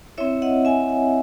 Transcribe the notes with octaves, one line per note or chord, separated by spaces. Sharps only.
C4 E4 C#5 E5
D#5 F#5
E5 G#5